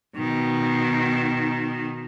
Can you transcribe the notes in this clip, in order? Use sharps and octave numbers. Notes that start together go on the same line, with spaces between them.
B2 D#3